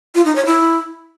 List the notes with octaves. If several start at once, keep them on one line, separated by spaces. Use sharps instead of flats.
F4
D#4
C#5
E4